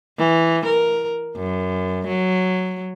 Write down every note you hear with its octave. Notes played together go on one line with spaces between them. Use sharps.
E3
A#4
F#2
F#3